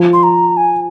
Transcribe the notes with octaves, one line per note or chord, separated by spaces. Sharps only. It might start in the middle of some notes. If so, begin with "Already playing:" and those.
Already playing: F3
C6
A#5
G#5